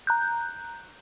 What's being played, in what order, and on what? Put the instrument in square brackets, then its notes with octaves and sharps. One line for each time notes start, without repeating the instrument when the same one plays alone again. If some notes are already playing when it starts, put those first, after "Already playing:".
[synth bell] A#5 F#6 G6